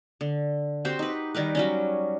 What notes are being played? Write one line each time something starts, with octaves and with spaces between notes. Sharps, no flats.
D3
C4 F#4 G4 C5
D#4 B4
D#3 G3 A#4 B4
F#3 G3 C#4